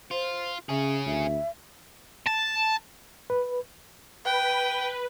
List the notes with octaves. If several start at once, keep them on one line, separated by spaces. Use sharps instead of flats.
F4 C5
C#3 C#4 G#4 E5
D2 E5
A5
B4
B4 G5